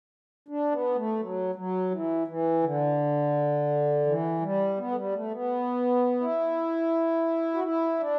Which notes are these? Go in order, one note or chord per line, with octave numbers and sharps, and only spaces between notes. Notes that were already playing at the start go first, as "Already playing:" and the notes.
D4
B3
A3
F#3
F#3
E3
E3
D3
E3
G3
B3
A3
G3
A3
B3
E4
F#4
E4
D4